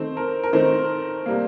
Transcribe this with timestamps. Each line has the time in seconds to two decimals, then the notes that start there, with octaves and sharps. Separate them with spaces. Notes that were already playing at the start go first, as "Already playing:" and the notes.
Already playing: D#3 A3 C4 C5
0.17 A#4
0.43 A#4
0.53 D#3 A3 C4 C5
1.26 C3 G3 A#3